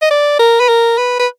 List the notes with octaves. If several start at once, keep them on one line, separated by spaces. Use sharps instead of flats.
D#5
D5
A#4
B4
A#4
B4
B4